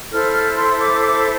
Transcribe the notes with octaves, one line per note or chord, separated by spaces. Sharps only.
E4 A4 C5 F6
F6
C6
D6
D6